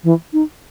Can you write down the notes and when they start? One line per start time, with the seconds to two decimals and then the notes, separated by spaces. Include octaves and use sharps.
0.04 E3
0.33 D#4